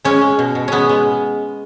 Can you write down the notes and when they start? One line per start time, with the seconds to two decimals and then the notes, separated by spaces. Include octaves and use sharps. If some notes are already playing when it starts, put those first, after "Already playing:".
0.05 G#3 C#4
0.21 G#3
0.39 B2
0.55 B2
0.68 G#3 B3 C#4
0.89 G#3